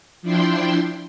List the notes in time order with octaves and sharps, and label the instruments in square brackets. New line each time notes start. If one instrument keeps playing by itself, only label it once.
[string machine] F3 D4 E4 G5 C6